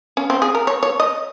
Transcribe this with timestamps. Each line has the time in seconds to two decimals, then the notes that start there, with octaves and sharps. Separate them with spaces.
0.17 C#4
0.30 C4
0.42 G#4
0.55 A#4
0.67 C#5
0.83 C#5
1.00 D#5